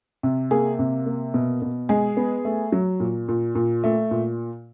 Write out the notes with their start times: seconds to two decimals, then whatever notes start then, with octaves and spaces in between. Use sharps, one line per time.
0.23 C3
0.51 A#3 G#4
0.79 C3
1.06 A#3
1.34 B2
1.62 B2
1.89 G#3 G#4
2.17 B3
2.45 A3
2.72 F#3
3.00 A#2
3.29 A#2
3.55 A#2
3.84 A3
4.11 A#2